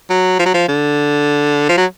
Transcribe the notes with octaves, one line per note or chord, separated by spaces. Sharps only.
F#3
F3
F#3
F3
D3
F3
F#3